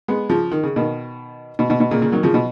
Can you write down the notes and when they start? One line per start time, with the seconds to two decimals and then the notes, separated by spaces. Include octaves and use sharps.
0.08 G#3 B3
0.29 C#3 F3
0.52 D#3
0.63 C#3
0.76 B2 D#3
1.59 B2
1.70 B2
1.80 B2
1.91 A#2 C#3
2.02 A#2 C#3
2.12 D#3 F#3
2.23 C#3 F3
2.34 B2